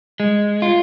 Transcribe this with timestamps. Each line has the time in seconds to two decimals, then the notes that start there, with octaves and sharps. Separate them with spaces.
0.20 G#3
0.62 F4